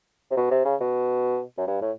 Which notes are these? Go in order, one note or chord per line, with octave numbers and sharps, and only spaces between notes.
C3
B2
C3
C#3
B2
F#2
G2
A2